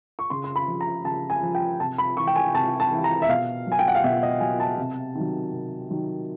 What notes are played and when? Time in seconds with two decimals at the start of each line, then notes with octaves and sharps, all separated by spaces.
0.19 C#6
0.30 C#3 C6
0.44 C6
0.56 B5
0.68 F3
0.81 A#5
1.04 C#3 A5
1.30 G#5
1.43 F3
1.55 G5
1.80 C3 A5
1.98 B5
2.17 E3 C#6
2.27 G5
2.36 G#5
2.54 C3 A5
2.80 A5
2.91 E3
3.04 A#5
3.22 E5
3.29 B2 F5
3.67 F#3 G#5
3.79 G5
3.88 F#5
3.95 F5
4.04 B2 E5
4.23 D#5
4.40 F#3 G#5
4.60 A5
4.78 C3
5.15 D#3 F#3
5.53 C3
5.90 D#3 F#3